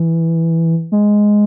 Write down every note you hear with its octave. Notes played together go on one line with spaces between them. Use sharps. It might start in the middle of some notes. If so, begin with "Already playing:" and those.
Already playing: E3
G#3